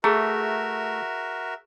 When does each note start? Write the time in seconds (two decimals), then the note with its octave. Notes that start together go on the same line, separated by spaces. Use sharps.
0.04 A3 F#4 G#4 A#4 E5 A#5